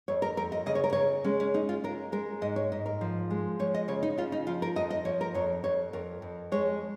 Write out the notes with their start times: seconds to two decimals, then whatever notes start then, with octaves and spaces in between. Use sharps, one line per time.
0.08 F2 C#5
0.22 A#4
0.37 F2 A#4
0.52 D#5
0.66 C#3 D#5
0.75 C#5
0.84 A#4
0.93 C#3 C#5
1.24 G#3 C#4
1.40 C#4
1.54 C#4 D#4
1.69 F4
1.84 G#3 A#4
2.12 G#3 A#4
2.41 G#2 D#5
2.56 C#5
2.72 G#2 D#5
2.86 A#4
3.01 F3
3.31 G#3
3.59 F3 C#5
3.74 D#5
3.88 C#3 C#5
4.03 D#4
4.18 C#3 F4
4.32 D#4
4.47 F3 F4
4.62 A#4
4.76 F2 D#5
4.90 D#5
5.05 F3 C#5
5.21 A#4
5.35 F2 C#5
5.64 F2 C#5
5.93 F2 A#4
6.22 F2
6.52 G#3 C#5